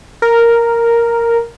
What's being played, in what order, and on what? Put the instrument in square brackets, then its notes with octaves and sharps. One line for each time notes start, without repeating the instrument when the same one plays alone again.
[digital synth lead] A#4